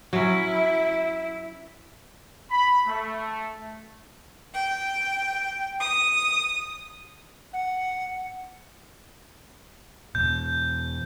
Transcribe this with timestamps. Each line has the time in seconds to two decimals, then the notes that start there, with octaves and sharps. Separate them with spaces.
0.13 F#3 C#4 E4
2.51 B5
2.86 A3
4.54 G5
5.79 D#6
7.53 F#5
10.15 E2 B2 G6